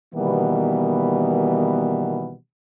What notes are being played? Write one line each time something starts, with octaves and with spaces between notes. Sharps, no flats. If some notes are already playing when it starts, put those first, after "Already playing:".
B2 D#3 E3 G3 A#3 B3